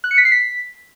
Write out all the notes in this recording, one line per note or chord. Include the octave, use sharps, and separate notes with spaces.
F#6
C#7
B6
C7
B6